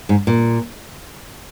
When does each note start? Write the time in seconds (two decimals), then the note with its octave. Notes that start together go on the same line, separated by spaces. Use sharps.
0.09 G#2
0.27 A#2